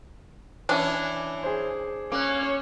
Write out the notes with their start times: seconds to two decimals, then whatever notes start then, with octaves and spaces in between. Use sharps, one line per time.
0.69 E3 C#4 D4 E4
1.43 G#4 C5
2.12 A#3 C#4 C#5 D6 F#6